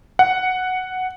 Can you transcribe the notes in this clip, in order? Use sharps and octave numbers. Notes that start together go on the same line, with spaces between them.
F#5